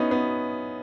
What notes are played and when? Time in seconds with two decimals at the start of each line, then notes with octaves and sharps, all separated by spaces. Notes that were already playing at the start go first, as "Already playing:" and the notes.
Already playing: B3 C#4 D#4 E4
0.11 B3